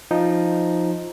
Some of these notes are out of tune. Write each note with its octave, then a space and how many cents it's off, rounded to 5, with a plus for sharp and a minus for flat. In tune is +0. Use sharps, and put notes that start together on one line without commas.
F3 +0 D#4 +0